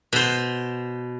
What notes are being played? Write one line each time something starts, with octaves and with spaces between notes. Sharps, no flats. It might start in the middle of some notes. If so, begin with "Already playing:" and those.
B2 C5